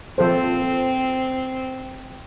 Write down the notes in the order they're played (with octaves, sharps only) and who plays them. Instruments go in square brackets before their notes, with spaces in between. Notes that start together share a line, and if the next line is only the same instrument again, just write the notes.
[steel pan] F3 A4 C5 [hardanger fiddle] C4